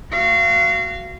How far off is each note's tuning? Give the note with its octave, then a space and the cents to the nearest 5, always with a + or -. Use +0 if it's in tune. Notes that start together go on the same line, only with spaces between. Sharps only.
F#4 +0 F5 -30